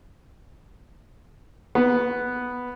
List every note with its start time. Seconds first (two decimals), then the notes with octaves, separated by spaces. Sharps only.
1.75 B3